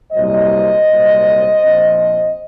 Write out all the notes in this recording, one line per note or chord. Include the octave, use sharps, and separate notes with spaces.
C2 A#2 F#3 A#3 C5 D#5
C2 A#2 F#3 C4
A#1 A#2 F3 C4